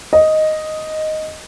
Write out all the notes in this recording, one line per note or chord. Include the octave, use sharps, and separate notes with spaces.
D#5